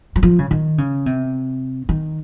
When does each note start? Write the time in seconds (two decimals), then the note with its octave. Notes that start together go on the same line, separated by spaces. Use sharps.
0.16 F#3
0.23 F3
0.39 C#3
0.51 D#3
0.78 C#3
1.06 C3
1.89 D#3